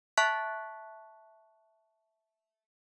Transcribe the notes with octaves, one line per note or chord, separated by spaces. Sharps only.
E5 A5 C#6 F#6 B6